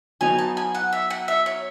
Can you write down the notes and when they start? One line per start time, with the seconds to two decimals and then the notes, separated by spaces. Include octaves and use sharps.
0.21 F#3 B3 D#4 G#5
0.39 A5
0.57 G#5
0.75 F#5
0.93 E5
1.10 F#5
1.28 E5
1.46 C#5